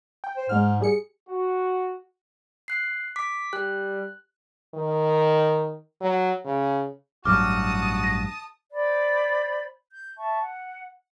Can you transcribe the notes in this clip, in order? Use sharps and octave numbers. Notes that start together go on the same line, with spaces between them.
G5
C5
G#2 G#3 F6
G3 G#4 C#7
F#4
F#6 C7
D6 B6
G3 F#6
D#3
F#3
C#3
A1 G2 F#3 F#4 A5 D6 D#6 F6
A#6
C5 D5 B5
G6
E5 A5 C#6
F#5